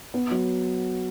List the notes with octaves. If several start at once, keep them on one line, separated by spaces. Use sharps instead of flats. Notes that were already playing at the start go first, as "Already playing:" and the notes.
B3
F#3